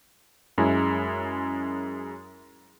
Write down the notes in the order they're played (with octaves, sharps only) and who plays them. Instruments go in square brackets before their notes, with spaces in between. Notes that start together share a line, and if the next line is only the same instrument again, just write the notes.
[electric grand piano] F#2 G#3 C#4 E4